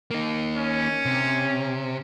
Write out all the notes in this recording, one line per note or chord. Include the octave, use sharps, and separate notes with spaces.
A#3 D#4
C#4
C3